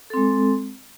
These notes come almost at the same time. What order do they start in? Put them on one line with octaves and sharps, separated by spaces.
A4 C4 G#3